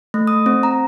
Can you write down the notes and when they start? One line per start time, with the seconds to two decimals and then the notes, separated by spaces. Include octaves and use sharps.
0.14 A3
0.27 D#6
0.46 C4
0.63 A#5